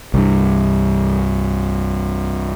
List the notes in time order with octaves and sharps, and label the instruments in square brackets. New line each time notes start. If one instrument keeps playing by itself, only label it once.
[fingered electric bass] C2 G2